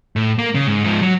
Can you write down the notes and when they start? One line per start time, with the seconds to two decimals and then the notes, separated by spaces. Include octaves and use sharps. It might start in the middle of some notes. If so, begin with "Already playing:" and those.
0.16 A2
0.39 A#3
0.55 C#3
0.67 G#2
0.84 G#2 F3
1.02 F#3